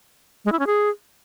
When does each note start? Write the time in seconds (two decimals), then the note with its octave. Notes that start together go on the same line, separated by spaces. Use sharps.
0.45 G#3
0.52 E4
0.59 C#4
0.67 G#4